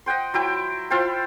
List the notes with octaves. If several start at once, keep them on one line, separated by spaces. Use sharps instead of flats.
D#5 F#5 G5 C6
F#3 E4 G5
E4 F4 C5 G5